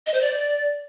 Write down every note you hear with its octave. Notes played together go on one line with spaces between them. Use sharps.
D#5
C5
D5